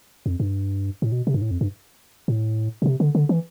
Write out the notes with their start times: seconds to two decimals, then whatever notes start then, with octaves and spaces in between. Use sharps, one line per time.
0.26 F2
0.40 G2
1.02 A2
1.12 B2
1.27 C3
1.34 G2
1.42 A2
1.51 F2
1.61 G2
2.28 A2
2.82 B2
2.86 C3
3.00 D3
3.15 D3
3.29 E3